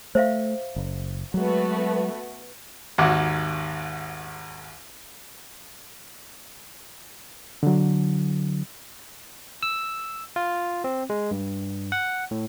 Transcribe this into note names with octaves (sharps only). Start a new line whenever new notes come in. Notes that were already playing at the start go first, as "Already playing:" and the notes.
A3 C5 E5 F5
F#1
F#3 G#3 A3 B3 F#4
G#1 D#2 F#4 D6
D3 F#3
E6
F4
C4
G#3
G2
F#5
A2